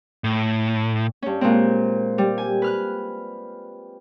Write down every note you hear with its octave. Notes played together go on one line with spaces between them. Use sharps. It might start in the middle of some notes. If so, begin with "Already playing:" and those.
A2
G2 C#4
A#2 G#3 C4
G3
G#5
B4 F6 F#6